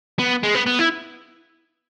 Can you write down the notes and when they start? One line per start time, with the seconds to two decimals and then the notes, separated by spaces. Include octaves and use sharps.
0.19 B3
0.43 G#3
0.55 B3
0.66 B3
0.79 E4